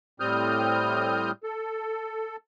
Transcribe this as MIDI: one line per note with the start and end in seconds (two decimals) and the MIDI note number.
0.20 1.31 45
0.20 1.31 55
0.20 1.31 60
0.20 1.31 87
0.20 1.31 89
0.20 1.31 91
1.44 2.36 69